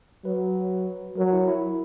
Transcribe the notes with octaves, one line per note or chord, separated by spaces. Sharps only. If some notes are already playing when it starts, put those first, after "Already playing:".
F#3 B4
F#3 A#4
E4
E4